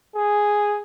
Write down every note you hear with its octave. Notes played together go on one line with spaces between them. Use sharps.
G#4